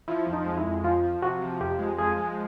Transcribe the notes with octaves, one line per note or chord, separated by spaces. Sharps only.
F3 E4
F2
D#4
G#3
E4
F2
F3 F4
F3
C3 F#4
F3
F2 G4
G#3
F3 G#4
G#3